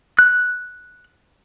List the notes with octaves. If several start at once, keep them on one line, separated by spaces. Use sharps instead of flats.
F#6